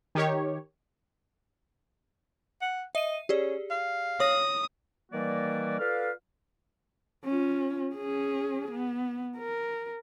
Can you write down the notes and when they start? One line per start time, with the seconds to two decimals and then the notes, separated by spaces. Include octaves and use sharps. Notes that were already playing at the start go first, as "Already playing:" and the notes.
0.15 D#3 G4 C#5
2.61 F#5
2.95 D#5 E5 D#7
3.29 C#4 G4 G#4 D5
3.70 F5
4.20 C#5 D#6 A#6
5.12 D#3 E3 G3 A#3 F#4 D5
5.79 F4 A4 B4 D5 F5
7.25 C#4 F4
7.95 C#4 G#4
8.71 B3
9.37 A#4